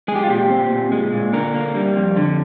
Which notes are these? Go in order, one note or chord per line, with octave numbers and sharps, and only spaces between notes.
G#3 G#4
G4
F4
A#2 G4
C4
A#2
G#3
A#2
D3 A#4
A#3
G3
F2
D3